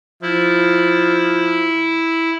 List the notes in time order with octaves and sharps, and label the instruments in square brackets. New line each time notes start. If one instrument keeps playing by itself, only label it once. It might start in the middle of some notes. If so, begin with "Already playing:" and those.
[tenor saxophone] F3 [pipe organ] E4